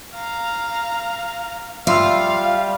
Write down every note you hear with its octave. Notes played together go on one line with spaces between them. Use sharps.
F5 A#5
G3 F4 E5 F5 C6 E6